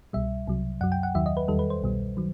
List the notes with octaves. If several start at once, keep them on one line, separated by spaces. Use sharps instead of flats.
C2 B2 G3 E5
C2 C3 F#3
F#2 F#3 F#5
G5
F#5
D#2 D#3 F#3 E5
D#5
B4
E2 D#3 G3 A4
B4
C5
C2 B2 G3
D#3 F#3